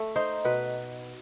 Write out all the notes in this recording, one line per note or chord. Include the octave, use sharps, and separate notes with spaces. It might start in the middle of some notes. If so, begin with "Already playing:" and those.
Already playing: A3
D#4 C5
B2 B4